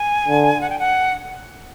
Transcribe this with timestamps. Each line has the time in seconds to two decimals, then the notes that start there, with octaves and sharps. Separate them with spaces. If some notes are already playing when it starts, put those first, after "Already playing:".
Already playing: G#5
0.28 D3
0.61 F#5
0.70 G5
0.79 F#5